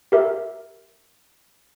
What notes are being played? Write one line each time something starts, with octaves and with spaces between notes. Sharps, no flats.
G4 A#4 E5